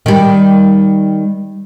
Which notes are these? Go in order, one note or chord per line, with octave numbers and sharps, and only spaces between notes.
D#3 G3